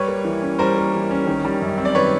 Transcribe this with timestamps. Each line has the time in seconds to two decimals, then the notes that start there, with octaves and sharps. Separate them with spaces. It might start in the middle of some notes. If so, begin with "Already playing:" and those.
Already playing: G3 B4 C#5
0.08 A#3
0.25 E3
0.42 C#4
0.59 G3 A#4 C5
0.76 A#3
0.93 E3
1.11 C#4
1.27 D#3
1.45 G3
1.62 F#2
1.78 C4
1.85 D5
1.95 D#3 B4 C#5